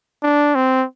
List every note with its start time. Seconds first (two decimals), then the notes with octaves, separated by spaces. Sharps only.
0.23 D4
0.55 C4